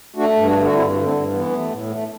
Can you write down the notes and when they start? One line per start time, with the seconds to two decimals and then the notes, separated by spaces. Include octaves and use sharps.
0.16 A3 D4 F#4
0.35 G2
0.45 D4 F#4
0.55 D3
0.64 F#4
0.74 G2 C4 E4
0.93 D3
1.03 A3 C4
1.12 G2
1.31 E3 B3
1.51 A3
1.70 A2
1.89 A3